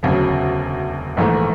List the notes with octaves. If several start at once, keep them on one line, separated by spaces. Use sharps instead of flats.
E1 D2 C#3 F#3
A#1 G#2 E3 A3